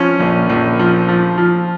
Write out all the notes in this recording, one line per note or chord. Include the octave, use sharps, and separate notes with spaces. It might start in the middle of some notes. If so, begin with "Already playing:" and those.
Already playing: F3 C#4
A#1
A#1
F3
F3
F3